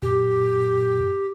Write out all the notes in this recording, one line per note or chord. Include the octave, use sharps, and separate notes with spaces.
F#2 A#2 G4